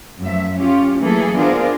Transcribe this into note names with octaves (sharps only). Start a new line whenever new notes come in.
F#2 F3 A3 E5
C#4 F4 G4
E3 F#3 A3 A#3 G#4 A4
B3 D4 F4 G#4 A#4 C5